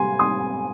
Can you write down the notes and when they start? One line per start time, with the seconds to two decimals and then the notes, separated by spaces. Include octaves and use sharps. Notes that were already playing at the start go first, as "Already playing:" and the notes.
Already playing: C3 G#5 C6
0.19 C6 D#6